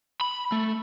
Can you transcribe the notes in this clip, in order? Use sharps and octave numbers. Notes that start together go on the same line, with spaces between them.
B5
A3